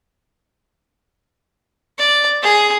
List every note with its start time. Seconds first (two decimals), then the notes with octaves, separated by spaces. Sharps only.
1.98 D5
2.43 G#4